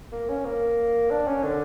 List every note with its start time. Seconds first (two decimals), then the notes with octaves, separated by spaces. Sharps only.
0.12 A#3
0.29 C#4
0.45 A#3
1.11 D4
1.27 C#4
1.44 D3